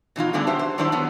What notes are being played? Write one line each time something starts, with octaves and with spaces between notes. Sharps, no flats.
B2 E3 D#4 F4
D3 G3 A3 B3 D4 G#4
F#4 G4 C5 E5
C5
D#3 F#3 G3 D4 E4 C5
F#3 B3 F#4